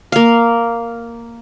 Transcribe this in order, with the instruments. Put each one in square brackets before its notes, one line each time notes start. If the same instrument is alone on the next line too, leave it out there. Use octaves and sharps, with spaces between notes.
[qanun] A#3 F5